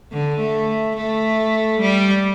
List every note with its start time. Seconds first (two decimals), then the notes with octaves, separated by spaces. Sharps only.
0.12 D3
0.40 A3
0.97 A3
1.81 G3